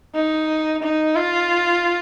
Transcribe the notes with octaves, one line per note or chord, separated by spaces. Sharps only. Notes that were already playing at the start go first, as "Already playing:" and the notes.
D#4
D#4
F4